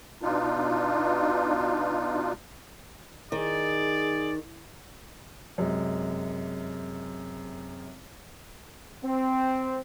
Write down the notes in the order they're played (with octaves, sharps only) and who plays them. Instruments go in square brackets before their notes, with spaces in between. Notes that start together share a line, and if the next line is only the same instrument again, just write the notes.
[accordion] B2 D4 D#4 F4
[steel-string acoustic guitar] D#3 [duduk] G#4 [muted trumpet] D5
[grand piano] F#2 C3 G#3
[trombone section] C4